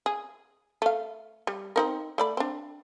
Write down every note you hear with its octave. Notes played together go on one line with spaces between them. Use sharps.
G#4
A3 F5
G3
C4 D#4 A#4
A3 D5 B5
C4 D4